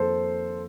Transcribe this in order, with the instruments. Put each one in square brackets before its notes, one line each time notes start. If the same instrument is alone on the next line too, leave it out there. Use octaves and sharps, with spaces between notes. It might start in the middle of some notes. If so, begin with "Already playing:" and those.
Already playing: [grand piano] F2 D#3 A#3 [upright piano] A4 C5